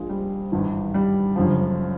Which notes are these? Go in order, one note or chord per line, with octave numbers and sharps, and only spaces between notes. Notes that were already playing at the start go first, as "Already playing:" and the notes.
Already playing: A#1 A#2 F3 G#3
G3
G#1 G2 E3
G3
F#1 F#2 D3 F3